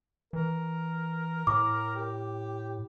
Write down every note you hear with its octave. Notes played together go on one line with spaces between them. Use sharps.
E3 A#4
A2 D6
G4